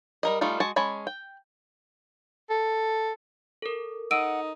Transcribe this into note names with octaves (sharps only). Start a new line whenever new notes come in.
G3 A#4 D#5
G3 A3 D#4 F4
G#3 F#4 G#5 A5
G#3 C#4 G#5 A5 B5
G5
A4
A4 A#4
D#4 F#5 E6 D7 D#7